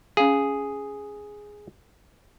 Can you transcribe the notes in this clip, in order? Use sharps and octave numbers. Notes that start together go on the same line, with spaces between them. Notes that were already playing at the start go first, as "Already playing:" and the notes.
C#4 G#4 F5